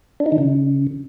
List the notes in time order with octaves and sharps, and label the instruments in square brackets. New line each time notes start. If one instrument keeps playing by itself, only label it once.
[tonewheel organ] D4
D#4
D#3
C#3